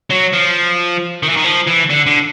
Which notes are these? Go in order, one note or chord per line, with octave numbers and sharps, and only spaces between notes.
F#3
F3
D#3
E3
D#3
F3
E3
D3
D3